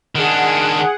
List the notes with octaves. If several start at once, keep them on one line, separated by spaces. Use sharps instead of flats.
D#3 D4 G#4 F#5